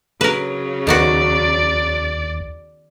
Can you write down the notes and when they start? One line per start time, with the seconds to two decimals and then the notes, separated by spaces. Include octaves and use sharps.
0.21 C#3 F#3 A#4 B4
0.87 D#2 D#3 B3 F#4 D5